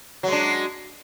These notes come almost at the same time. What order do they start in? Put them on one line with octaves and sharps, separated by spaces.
F#3 G#3 D4